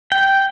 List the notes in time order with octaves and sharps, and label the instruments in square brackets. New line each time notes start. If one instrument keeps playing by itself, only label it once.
[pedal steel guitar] G5